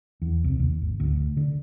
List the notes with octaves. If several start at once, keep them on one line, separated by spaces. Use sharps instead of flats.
E2
C2
D#2
G#1
D2
D3